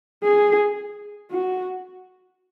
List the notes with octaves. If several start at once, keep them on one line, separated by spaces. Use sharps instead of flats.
G#4
F#4